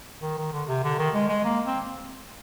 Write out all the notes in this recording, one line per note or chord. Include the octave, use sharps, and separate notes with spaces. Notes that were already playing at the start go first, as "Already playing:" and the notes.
D#3
D#3
D3
C3
D3
D#3
G#3
G#3
A#3
C4